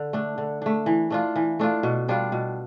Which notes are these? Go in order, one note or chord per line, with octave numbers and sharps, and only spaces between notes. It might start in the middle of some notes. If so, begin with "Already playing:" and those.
Already playing: D3
A3 D4
D3
A3 D4
E3
A3 D4 F4
E3
A3 D4 F4
B2
G3 D4 F4
B2